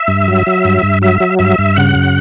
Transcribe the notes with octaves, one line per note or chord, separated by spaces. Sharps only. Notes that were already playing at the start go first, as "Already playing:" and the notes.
Already playing: E5
G2
F#3
F#3
G2
G2
F#3 E5
F#3
G2 E5
G2
C#3 F#5
F#2